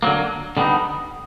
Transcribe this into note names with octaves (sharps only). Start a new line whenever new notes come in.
D3 F#3 A#3
D3 G3 B3 D#4